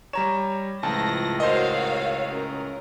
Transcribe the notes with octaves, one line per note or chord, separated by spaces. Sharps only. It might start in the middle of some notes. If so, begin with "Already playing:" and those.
G3 C#5 A#5 E7
C#2 A2 F3 A5 A#6
F#4 A#4 C5 C#5 D#5 F5
C#4 A#4